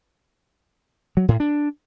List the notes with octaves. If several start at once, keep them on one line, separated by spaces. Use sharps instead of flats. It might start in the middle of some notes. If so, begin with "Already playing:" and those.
F#3
A2
D4